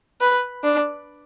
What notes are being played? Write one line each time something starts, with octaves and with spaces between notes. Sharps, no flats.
B4
D4